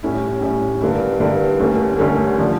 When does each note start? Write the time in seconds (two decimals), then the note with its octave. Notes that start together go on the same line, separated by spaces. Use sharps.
0.03 A2 G3 C#4 E4
0.41 A2 G3 C#4 E4
0.81 G2 D3 G3 A#3 E4
1.20 G2 D3 G3 A#3 E4
1.60 D2 D3 G3 A#3 C#4
1.99 D2 D3 G3 A#3 C#4
2.38 D3 F3